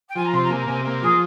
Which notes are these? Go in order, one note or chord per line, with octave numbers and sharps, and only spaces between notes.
G5
F3 G#5
A#5
C3 C6
A#5
A#3 G#5
A#5
C3 G#5
A#3
F3 G#4